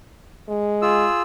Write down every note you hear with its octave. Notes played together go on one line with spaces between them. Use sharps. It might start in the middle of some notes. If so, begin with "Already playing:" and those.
G#3
F4 G#4 E6